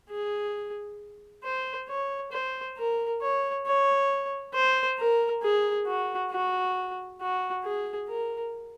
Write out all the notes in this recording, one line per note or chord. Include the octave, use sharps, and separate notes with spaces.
G#4
C5
C#5
C5
A#4
C#5
C#5
C5
A#4
G#4
F#4
F#4
F#4
G#4
A#4